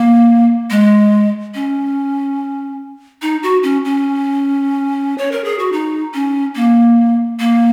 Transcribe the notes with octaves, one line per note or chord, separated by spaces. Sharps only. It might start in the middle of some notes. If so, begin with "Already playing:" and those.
Already playing: A#3
G#3
C#4
D#4
F#4
C#4
C#4
C#5
A#4
G#4
F#4
D#4
C#4
A#3
A#3